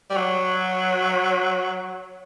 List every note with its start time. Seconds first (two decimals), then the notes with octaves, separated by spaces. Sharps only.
0.10 G3
0.16 F#3